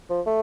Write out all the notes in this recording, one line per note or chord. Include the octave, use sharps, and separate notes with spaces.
F3
A3